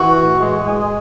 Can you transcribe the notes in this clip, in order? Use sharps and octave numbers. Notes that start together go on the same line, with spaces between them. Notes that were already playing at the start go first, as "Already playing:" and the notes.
Already playing: E3 F#4
A2
G#3
G#3